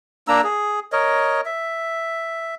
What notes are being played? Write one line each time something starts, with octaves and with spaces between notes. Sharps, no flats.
A#3 D4 A#5 E6
G#4
A#4 C#5 D#5
E5